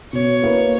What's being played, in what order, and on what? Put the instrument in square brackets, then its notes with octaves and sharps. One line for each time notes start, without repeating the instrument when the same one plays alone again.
[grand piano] B2 [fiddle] C#5
[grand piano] A#3 E4 B4